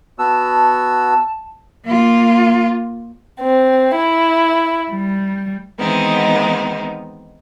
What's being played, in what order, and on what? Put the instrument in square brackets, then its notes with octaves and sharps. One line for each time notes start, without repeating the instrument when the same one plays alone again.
[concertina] B3 F#4 E6 [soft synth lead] A5
[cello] A#3 F4
[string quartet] C4
E4
G3
D#3 E3 G#3 B3 C4 D#4